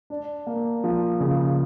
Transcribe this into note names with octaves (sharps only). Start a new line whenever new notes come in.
D4
A#3
F3
C#3